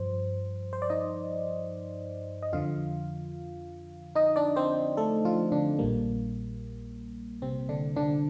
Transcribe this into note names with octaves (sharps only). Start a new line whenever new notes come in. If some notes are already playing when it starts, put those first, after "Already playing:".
Already playing: G2 F3 C5
C5
D5
D#4 D#5
D#5
F2 D3 F3 F4 F5
D#4 D#5
D4 D5
C4 C5
A3 A4
F3 F4
D3 D4
A#1 A#2 G3 A#3
C3 C4
D3 D4
D3 D4